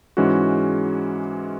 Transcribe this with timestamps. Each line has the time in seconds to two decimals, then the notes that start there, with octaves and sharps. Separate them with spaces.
0.17 G#2 E3 G#3 C#4 F#4